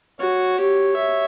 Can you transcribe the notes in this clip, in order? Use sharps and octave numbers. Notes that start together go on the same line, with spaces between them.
F#4 C#5
G4 C#5
E5